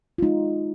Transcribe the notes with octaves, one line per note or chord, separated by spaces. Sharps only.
F4
G#3 D#4